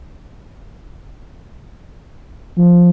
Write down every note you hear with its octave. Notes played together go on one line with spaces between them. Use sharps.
F3